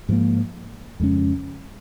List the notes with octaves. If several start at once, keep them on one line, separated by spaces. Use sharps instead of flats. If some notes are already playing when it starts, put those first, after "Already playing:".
G#2 F3 A#3
F2 C#3 G#3 C#4